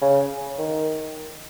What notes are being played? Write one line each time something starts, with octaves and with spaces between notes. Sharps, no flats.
C#3
D#3